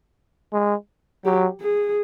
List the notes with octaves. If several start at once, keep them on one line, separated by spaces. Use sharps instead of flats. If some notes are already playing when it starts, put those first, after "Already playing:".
G#3
F#3 G4
G#4